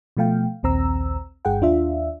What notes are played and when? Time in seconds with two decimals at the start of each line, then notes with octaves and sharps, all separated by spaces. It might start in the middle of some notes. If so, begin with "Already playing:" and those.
0.17 B2 F3 A3 F5 G5
0.63 A#1 D#2 C4 A#5 E6
1.45 G1 G2 G#4 F#5 G5
1.61 D#2 D4 F4 E5